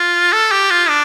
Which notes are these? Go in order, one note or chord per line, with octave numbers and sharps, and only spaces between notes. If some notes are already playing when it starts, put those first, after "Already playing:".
Already playing: F4
A4
G4
F4
D4